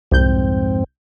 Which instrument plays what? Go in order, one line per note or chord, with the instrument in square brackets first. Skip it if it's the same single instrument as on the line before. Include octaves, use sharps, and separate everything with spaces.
[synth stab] C2 G6 [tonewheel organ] F2 G#2 C4